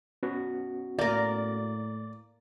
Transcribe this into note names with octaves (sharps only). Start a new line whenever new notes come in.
B3 C#4 F#4
A2 A#3 A#4 D5